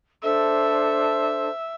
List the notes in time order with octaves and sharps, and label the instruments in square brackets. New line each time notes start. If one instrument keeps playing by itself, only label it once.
[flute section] D4 A4 C5 [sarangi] E5